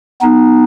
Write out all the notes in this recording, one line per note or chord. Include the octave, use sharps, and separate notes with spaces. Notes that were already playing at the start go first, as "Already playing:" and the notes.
B3 D#4